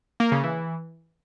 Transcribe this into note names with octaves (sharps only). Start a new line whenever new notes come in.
A#3
C#3
E3